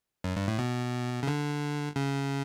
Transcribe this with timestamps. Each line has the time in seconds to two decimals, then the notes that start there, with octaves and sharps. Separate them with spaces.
0.24 F#2
0.36 G2
0.48 A2
0.59 B2
1.23 C#3
1.28 D3
1.96 C#3